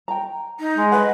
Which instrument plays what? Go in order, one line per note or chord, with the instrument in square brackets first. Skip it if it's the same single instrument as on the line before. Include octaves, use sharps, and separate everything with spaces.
[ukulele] G5 A#5
[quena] D#4
[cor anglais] G#3
[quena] B4 [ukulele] D#5 F#5